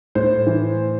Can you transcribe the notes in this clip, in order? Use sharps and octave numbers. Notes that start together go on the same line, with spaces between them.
A2 C5
E3